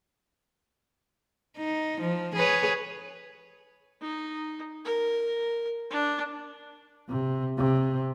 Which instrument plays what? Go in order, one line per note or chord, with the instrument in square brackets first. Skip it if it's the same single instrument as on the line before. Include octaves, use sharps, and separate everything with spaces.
[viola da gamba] D#4
F3
G#4 B4 C#5
[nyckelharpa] D#4
A#4
D4
[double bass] C3
C3